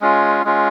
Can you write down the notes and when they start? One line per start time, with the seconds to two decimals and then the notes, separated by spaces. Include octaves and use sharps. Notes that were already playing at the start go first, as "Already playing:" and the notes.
0.01 G#3 C#4 F4
0.45 G#3 C#4 F4